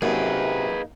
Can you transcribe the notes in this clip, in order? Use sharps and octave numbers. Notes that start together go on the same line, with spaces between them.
F#2 C3 A#3 D#4 G#4 B4